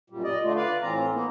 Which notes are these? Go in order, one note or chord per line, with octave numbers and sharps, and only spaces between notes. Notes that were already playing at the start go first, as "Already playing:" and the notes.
F#2 A#2 G3
D5 D#5
D3 A3 F4
B4 D5 F5
A2 E3 C4 F4 A#5
A#3 B3 D#4